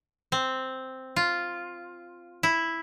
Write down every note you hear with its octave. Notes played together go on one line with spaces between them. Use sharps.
C4
F4
E4